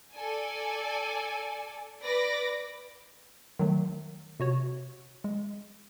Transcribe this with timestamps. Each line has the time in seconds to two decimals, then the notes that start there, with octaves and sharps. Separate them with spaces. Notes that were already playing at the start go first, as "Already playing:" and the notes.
0.14 A4 D5 G#5
2.03 B4 D5 D6 A#6
3.59 D#3 F#3 A3
4.40 C3 F#4 C#5
5.24 G#3